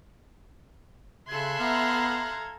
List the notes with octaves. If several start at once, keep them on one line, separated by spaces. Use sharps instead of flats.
C#3 A4 E5 C6 F#6 G#6
B3 F5 A#5